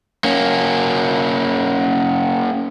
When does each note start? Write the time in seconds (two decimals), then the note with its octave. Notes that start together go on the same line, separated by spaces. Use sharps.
0.24 A#3 C#4